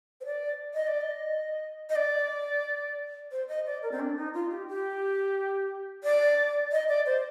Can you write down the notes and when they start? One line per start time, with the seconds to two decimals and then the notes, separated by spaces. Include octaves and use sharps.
0.21 C5
0.26 D5
0.74 D#5
0.87 D5
1.01 D#5
1.89 D#5
1.96 D5
3.31 C5
3.48 D#5
3.66 D5
3.83 A#4
3.92 C4
4.00 D4
4.17 D#4
4.34 F4
4.51 G4
4.68 G4
6.04 D5
6.72 D#5
6.89 D5
7.06 C5